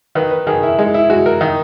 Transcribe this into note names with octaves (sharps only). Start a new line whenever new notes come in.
D#3 B4
B4
D#3 G#4
E4
G#3 D#4
E4
G#3 F#4
A#4
D#3